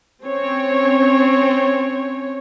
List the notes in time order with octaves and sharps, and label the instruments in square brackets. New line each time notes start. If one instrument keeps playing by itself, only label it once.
[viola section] C4 C#4 C#5